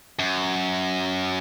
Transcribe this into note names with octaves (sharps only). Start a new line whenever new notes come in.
F#2